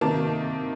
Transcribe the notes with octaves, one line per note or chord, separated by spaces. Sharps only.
C3 D#3 A#3 A5